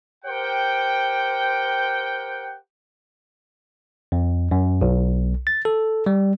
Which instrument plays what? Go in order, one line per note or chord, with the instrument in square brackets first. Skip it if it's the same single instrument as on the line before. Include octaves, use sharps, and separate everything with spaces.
[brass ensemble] G4 A#4 C5 F#5 G5
[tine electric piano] F2
F#2
B1
A6
A4
G3